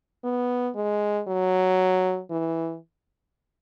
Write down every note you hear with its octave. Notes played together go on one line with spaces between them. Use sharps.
B3
G#3
F#3
E3